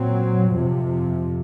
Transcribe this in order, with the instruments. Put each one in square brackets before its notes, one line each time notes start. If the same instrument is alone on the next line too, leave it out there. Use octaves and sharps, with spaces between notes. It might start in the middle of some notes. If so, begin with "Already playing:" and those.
Already playing: [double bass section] A#2 F#3 C4
F2 C3 F3